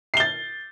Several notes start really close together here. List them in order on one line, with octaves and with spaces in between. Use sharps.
C7 G7 A6